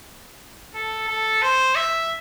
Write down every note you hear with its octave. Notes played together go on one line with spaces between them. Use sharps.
A4
A4
C5
E5